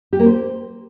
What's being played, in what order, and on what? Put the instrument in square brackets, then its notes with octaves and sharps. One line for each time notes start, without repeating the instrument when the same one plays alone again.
[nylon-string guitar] G4
A#3
C5